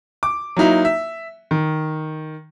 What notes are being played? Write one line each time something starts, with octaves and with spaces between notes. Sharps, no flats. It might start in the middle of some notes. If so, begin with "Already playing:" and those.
D6
F#3 A#3 D#4 E4
E5
D#3